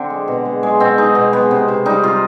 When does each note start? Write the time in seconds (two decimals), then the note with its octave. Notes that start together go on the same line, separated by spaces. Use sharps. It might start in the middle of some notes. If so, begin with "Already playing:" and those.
Already playing: D3 C4 D4
0.10 G#3
0.28 B2
0.45 G#3
0.63 G#3
0.80 B2 C4
0.98 G#3 D#4
1.15 B2
1.33 G#3 B3
1.51 C3
1.68 C3
1.85 G3 D#4
2.04 C3 F4